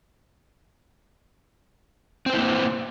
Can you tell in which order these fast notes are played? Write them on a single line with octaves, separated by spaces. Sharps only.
C4 C5 E4 A#3